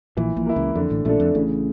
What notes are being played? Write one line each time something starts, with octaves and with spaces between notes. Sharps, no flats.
A#1 A#2 E3
A#1 A#2
A#3 E4
C#2 C#3
F2 D3
A1 A2
A#1 A#2 A3 D4 A4
F2
A1 A2 C#3